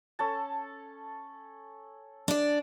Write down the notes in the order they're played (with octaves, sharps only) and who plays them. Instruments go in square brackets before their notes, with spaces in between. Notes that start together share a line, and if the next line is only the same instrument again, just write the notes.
[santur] C#4 A4 A5
[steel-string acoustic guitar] D4 D5